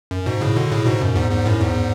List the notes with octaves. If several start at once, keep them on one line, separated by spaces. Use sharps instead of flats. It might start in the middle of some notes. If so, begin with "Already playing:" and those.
F#2
G#2 B2
A2 C#3
B2 D3
A2 C#3
G#2 B2
F#2
E2 G#2
E2 G#2
F#2 A2
E2 G#2